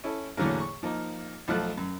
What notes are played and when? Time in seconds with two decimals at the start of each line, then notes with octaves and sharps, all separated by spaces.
0.04 C#4 E4 A4
0.37 E2 A2 D3 F#3 A#3
0.60 C#6
0.83 F3 A#3 D#4
1.48 B1 F3 A3 F#6
1.78 F#2